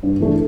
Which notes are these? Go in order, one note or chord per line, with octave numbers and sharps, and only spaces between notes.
G2
E3 A3 D4